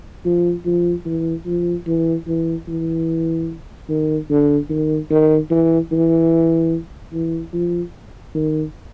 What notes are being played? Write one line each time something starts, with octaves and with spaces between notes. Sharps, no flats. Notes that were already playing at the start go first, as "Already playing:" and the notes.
F3
F3
E3
F3
E3
E3
E3
D#3
D3
D#3
D#3
E3
E3
E3
F3
D#3